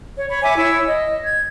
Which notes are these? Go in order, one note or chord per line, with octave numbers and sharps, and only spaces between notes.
C#5
C#5 B5
E5 G#5 D6
E4 C#5 E6
D#5
G#6